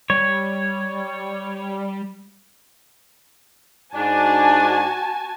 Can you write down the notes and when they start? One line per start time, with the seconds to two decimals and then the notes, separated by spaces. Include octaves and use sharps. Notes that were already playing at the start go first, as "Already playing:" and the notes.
0.10 G3 C#5
3.94 G#2 D4 F#4 G#5 A5